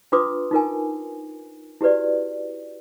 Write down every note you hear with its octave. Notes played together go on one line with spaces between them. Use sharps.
D4 F4 B4 C6 D6 D#6
D#4 F4 A#4 G#5
E4 F#4 G4 B4 D5